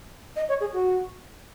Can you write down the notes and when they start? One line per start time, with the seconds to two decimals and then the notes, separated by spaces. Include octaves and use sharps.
0.36 D#5
0.49 C#5
0.60 G#4
0.73 F#4